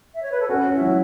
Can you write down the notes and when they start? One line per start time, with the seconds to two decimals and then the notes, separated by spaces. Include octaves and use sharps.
0.14 E5
0.22 C#5
0.32 B4
0.40 A4
0.48 C#4 F#4
0.65 C#4
0.73 E4
0.81 F#3